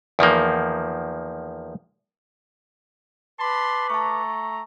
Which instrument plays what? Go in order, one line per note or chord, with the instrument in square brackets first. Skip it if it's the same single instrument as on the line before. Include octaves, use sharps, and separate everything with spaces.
[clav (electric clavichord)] E2 D#3 F3 A#3
[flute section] B4 D6 [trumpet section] A5 B5 C6
[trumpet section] A3 A#5 [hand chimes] A5 C#6